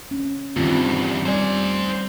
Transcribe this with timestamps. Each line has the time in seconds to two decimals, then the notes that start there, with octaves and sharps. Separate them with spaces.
0.11 C#4
0.57 E2 G2 D#3 C4 F4
1.25 G3 C5 D5 G#5